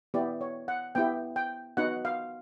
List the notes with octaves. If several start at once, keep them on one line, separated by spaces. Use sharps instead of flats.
B3 E4 G4 D5
C#5
F#5
B3 E4 G4 G5
G5
B3 D#4 F#4 F#5
F5